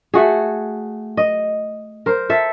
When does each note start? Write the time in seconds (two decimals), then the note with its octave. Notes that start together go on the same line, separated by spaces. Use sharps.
0.14 A3 F#4 G#4
1.17 D#5
2.06 A#4 C5
2.29 A4 E5